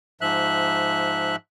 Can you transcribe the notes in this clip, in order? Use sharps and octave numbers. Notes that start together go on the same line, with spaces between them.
G#2 F3 E5 F#6